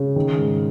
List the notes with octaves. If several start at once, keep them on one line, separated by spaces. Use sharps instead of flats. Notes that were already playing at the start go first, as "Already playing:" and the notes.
Already playing: C#3
D#3
G#2